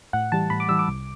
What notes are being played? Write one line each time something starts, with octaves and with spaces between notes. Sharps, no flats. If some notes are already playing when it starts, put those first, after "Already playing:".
A2 F#5
E3 G3 A5
A2 B5
D6
E3 G3 E6
D6
C2